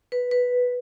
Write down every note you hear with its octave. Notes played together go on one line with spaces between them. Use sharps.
B4
B4